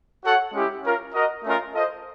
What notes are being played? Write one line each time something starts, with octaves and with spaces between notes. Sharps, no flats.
F#4 A4 C#5 F#5
G#3 C#4 E4 G4
C#4 F4 A#4
F#4 A#4 D#5
A3 C#4 F4 A#4 D#5
F4 A4 C5 D#5